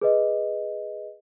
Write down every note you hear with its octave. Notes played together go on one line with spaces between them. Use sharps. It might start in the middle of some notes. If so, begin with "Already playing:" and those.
G#4 B4 D#5